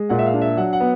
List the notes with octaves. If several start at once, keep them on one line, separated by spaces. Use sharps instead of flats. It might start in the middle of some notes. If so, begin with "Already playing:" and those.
Already playing: G#3
A#2 F#5
E5
F5
D4
E5
F#3 F#5
F#5
B3